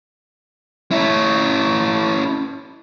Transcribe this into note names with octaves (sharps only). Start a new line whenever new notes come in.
C#4 E4